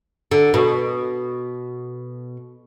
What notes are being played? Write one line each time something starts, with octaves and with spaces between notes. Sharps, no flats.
D3
B2